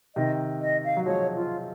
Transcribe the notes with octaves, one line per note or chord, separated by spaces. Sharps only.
C3 D#3 D#5
D#5
F5
F#3
F3 G#3 C#5
F4